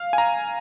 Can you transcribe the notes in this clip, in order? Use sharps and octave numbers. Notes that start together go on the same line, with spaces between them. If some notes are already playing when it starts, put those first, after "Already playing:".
Already playing: F5
G#5
A#5